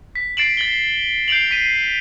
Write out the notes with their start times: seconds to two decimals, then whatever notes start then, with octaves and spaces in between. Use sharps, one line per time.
0.15 B6
0.37 A6 C7 D7 E7 F#7
0.57 A6 F#7 G7
1.28 G6 C7 D7 F7 F#7
1.51 B6 D#7